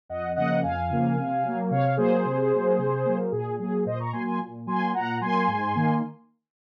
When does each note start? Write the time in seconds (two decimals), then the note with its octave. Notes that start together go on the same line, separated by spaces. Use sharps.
0.09 F2 D#5 F#5
0.36 C#3 F3 A#3 D#5 F#5
0.62 F2 F5 G#5
0.90 C#3 F3 A#3
1.17 C3
1.44 F#3 A#3
1.71 C3 C#5 F5
1.97 F#3 A#3 G#4 C5
2.25 C3
2.52 F#3 A#3
2.78 C3
3.05 F#3 A#3
3.32 A#2 G#4
3.59 F#3 A#3 G#4
3.86 A#2 C5 D#5
4.00 A#5 C#6
4.13 F#3 A#3 G#5 C6
4.26 G#5 C6
4.40 A#2
4.66 F#3 A#3 G#5 C6
4.93 A#2 F#5 A#5
5.21 F#3 A#3 G#5 C6
5.48 G#2
5.75 D#3 A#3